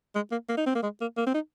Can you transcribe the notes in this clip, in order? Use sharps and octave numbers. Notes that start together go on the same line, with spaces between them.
G#3
A#3
A#3
D#4
C4
A#3
G#3
A#3
A#3
C4
D#4